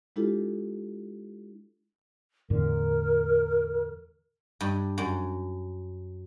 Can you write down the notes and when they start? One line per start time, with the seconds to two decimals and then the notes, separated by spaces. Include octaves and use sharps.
0.16 G#3 D4 E4 F4 G4 A4
2.50 E2 A2 D3 A#4
4.61 G2
4.98 F#2